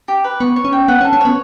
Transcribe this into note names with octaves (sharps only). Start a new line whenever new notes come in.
G4
B4
B3 C#6
C#5
C#4
G5
B3 F#5
C#4
A4
C#4
B3 C#5